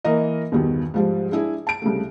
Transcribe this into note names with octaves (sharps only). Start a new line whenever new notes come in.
E3 A#3 A#4 D#5
E2 G2 B2 D#3
G#2 F3 G3
G#3 D4 E4 G#4
A5 D7
C2 C#3 A3